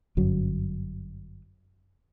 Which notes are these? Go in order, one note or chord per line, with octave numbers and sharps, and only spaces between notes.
G1 F#2 F#3